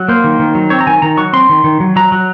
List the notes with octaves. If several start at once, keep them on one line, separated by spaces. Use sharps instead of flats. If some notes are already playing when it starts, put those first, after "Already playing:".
Already playing: F#3
A#3 C5
D#3
D#3
F#3
C4 C#5
A#5
D#3 G#5
D#3 A#5
F#3 C#6
C4 C6
D#3
D#3
F#3
F#3 A#5
F#3